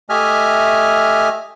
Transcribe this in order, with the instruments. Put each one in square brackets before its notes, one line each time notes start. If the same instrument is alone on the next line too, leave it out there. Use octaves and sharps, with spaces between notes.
[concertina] A3 G4 D#5 E5 G#5 F6